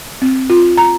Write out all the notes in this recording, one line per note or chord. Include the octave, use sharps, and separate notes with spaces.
C4
F4
A#5